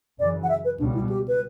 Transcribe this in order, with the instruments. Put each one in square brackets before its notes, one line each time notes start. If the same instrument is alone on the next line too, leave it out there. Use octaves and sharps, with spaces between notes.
[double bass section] F#2 C#3 E3 [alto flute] D5
[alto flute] F#5
E5
B4
[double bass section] C#2 B2 G3 [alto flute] D4
[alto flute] E4
G4
B4